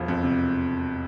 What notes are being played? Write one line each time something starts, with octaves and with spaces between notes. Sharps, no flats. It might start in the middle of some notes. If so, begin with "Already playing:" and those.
Already playing: E1 F3
F2
C3